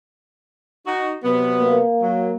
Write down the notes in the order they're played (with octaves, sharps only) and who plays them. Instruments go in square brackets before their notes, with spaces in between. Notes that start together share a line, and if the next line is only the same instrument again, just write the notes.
[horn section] D#4 F#4
C3 F#3 B3
[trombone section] A#3
[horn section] F#3